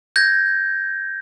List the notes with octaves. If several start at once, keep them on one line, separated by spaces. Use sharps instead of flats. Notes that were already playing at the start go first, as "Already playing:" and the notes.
G6 G#6 A#6